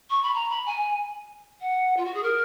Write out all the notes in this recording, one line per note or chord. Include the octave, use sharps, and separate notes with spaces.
C#6
B5
A#5
B5
G#5
F#5
F4
F#4
G#4
A#4